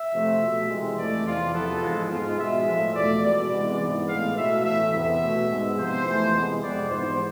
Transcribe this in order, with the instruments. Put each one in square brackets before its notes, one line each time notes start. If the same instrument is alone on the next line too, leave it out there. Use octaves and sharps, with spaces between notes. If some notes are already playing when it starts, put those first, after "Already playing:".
Already playing: [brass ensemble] E5
C3 F3 A3
B2 A3
C3 E3 G#3
F2 E3 A3 D5
E2 C3 E3 F4
E2 C3 F3 B3 A4
G#2 F3 G#3
G#2 G#3 B3 F4
B2 G#3 B3 E5
A2 F3 A3
E2 B2 A3 D5
B2 G#3 B3 D5
C3 E3 G#3 B3
G#2 E3 B3
A2 G#3 B3 F5
B2 A3 E5
A2 E3 A3 E5
E2 C3 E3 B3 E5
B2 A3
G#2 G#3 B3
C3 F3 B3 C5
F2 E3 A3
C3 G#3 B3
F2 C3 G#3 B3 D5
G#2 E3 B3 C5